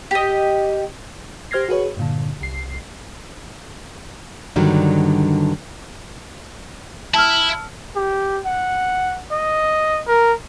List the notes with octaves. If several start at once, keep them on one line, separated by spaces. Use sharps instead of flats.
G4 D#5
G4 C5 F6 G#6 A#6 C7
F#4 G#4 B4 C#5
G2 A#2 D3
C2 C7
G2 D3 D#3 F#3 G3 D4
E4 A5 E6 F6
G4
F#5
D#5
A#4